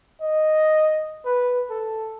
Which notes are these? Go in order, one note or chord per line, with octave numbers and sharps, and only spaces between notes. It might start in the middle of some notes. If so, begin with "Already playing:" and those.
D#5
B4
A4